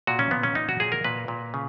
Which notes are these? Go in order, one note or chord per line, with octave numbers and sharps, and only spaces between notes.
A#2 F#4
C#4
A#2 B3
C#4
A#2 D#4
F#4
A#2 G#4
A#4
A#2 B4
A#2
C#3